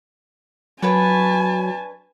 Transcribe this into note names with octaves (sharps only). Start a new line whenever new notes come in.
F#3 D4 B4 C#5 G#5 A5